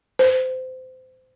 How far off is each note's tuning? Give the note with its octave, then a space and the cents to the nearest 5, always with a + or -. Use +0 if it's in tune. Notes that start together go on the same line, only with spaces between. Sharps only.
C5 -25